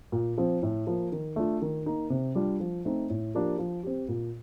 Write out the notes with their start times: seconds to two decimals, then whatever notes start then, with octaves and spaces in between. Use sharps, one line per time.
0.12 A#2
0.38 F3 C4
0.63 A2
0.87 F3 A#3
1.12 D#3
1.36 A3 D4 F4
1.62 D#3
1.86 A#3 D#4
2.10 C3
2.35 G3 D4 F4
2.60 F3
2.85 A3 C4 D#4
3.10 A2
3.35 F3 A#3 D4 G4
3.58 F3
3.83 C4 G4
4.08 A#2